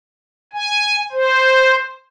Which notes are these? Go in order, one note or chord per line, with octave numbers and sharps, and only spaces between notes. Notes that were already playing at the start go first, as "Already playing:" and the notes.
G#5
C5